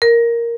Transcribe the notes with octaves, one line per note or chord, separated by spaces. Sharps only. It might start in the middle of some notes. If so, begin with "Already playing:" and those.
A#4